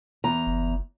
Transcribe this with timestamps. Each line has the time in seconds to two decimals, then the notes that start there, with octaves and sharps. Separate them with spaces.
0.24 E2 A#5
0.47 F#1